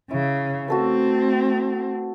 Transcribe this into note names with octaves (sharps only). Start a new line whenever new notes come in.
C#3 E4
A3 C4 F#4 A4 B4